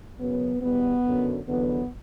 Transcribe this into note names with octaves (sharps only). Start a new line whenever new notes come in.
F#2 C#3 F#3 B3
E2 B2 G3 B3
F#2 D3 F#3
E2 D3 F#3 B3